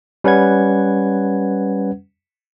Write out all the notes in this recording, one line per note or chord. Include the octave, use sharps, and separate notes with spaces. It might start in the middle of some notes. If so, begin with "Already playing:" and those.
G3 C#4 B4 F#5 G#6